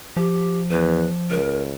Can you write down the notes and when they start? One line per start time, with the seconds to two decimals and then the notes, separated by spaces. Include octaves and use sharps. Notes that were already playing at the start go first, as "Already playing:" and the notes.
0.17 F3 G4
0.71 E2 B4
1.30 C#2 A#4